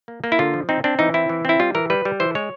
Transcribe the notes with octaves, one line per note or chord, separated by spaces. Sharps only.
A#3
A#3
E4
D3 F4
F3
C4 D#4
C4 D4
E3 D#4
C4 E4
E3
C4 E4
G3 F4
E3 A#4
G3 B4
G3
E3 C5
G#3 C#5